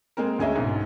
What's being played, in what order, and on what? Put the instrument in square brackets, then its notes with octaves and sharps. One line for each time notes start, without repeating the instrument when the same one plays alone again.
[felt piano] G#3 A#3 C4 A#4
D2 C#4 G#4 D#5 E5
B1 G#2